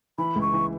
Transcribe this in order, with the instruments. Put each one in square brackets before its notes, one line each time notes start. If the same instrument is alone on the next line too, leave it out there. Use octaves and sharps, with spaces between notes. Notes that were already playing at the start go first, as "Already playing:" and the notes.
[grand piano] E3 [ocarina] B5
[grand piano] C#2
[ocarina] C#6
[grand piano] E3